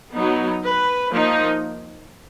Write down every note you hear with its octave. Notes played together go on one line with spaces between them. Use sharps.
F#3 B3 D#4
B4
F3 A#3 D#4